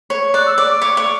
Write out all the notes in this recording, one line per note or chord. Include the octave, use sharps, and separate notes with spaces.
C#5
D5 F#6
E6
D5 D6
D6
C#5
C#5